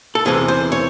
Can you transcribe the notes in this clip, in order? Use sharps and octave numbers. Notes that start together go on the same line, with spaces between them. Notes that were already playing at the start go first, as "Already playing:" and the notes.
A4
E2 C3 E3 G#4
C5
C#5